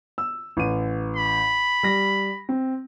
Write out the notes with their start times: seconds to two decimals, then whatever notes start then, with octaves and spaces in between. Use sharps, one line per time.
0.18 E6
0.57 A1 D#7
1.16 B5
1.83 G3 A#6
2.49 C4